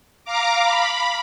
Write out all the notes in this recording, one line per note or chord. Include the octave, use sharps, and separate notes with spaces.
F5 A#5 D6
B5